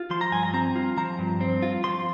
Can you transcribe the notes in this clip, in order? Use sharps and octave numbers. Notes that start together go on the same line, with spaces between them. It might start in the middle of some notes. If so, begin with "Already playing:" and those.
Already playing: F4
F3 C6
A#5
G2 G#5
A#5
C4 A#5
F4
F3 A#5
G2
C4
F4
F3 C6